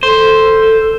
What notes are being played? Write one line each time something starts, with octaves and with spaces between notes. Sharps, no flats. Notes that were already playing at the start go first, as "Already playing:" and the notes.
A4 C5